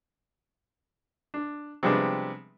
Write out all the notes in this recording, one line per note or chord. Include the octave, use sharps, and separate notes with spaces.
D4
C3 F3 G3 G#3 B3 D4